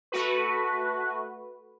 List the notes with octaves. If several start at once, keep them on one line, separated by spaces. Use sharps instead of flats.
A3 F#4 B4